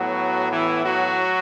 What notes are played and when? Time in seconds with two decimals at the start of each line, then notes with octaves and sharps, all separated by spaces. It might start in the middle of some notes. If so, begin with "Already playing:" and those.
Already playing: A2 F#3 B3 F#4
0.51 E3 E4
0.84 F#3 F#4